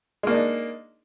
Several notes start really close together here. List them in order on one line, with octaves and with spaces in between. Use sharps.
G#3 A#3 D4 D#4